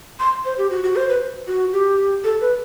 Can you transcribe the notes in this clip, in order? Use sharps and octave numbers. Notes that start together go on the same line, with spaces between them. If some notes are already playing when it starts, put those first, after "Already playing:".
C6
C5
G4
F#4
F#4
C5
B4
F#4
G4
A4
B4